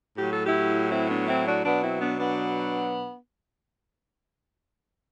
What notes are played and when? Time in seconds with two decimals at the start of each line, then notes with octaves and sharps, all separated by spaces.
0.18 A2 F#3 G4
0.32 A4
0.46 E4 G4
0.91 C4 E4
1.09 B3 D4
1.27 C4 E4
1.46 D4 F#4
1.64 B2 F#3 B3 D4
1.82 C4 E4
2.00 B3 D4
2.19 B3 D4